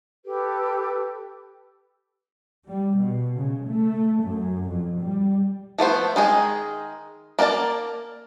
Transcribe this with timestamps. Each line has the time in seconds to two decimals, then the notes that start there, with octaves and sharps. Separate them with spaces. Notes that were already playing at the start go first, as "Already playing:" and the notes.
0.25 G4 A4 B4
2.68 G3
2.96 B2
3.38 C#3
3.68 A3
4.23 F#2
4.70 F2
5.01 G3
5.78 F3 A3 B3 C5
6.16 D#3 G#3 G#4 D#5
7.39 A#3 D4 A#4 D5 A5